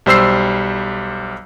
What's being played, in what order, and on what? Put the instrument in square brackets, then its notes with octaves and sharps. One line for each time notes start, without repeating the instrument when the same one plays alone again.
[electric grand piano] B1 G3 C5 E6 C7